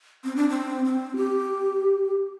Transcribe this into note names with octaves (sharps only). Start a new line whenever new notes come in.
C4
D4
C4
C4
G4